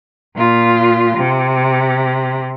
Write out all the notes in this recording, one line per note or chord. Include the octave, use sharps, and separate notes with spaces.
A#2 F4
C3